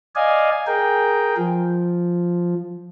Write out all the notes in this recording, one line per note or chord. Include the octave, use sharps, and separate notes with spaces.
D5 D#5 F5 G#5
G#4 A#4 G5
F3